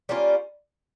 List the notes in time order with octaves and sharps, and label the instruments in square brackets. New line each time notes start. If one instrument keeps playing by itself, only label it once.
[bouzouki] G3 A#3 C#4 F4